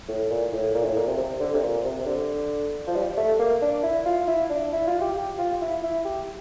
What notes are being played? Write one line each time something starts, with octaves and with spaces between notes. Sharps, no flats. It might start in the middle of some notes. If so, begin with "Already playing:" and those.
A2
A#2
A2
A#2
A2
A#2
C3
C3
D3
C3
A#2
C3
C3
D3
F3
G3
A3
A#3
D4
E4
F4
E4
D4
E4
F4
G4
G4
F4
E4
E4
G4